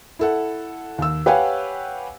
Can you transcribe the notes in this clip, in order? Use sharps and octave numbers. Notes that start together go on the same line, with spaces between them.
E4 A4 F#5
D#2 E6
G4 B4 C#5 F5 F#5 G#5